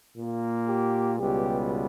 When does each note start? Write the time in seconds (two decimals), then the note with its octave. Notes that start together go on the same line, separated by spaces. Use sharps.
0.17 A#2 A#3
0.67 G4
1.17 C#2 B2 G3 B3 G4